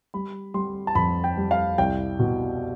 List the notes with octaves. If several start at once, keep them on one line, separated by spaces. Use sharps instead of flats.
G3 B5
G3 C6
A5
F2 B5
G5
G3
F5
C2 G5
B2